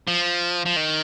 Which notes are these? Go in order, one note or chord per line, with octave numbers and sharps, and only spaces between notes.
F3
F3
D#3